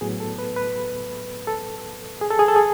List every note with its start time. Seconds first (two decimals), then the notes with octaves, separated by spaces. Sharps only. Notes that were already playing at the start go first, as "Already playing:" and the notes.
0.01 A2 F#3 B3 G#4
0.20 A4
0.39 B4
0.56 B4
1.47 A4
2.21 G#4
2.31 A4
2.39 G#4
2.48 A4
2.56 G#4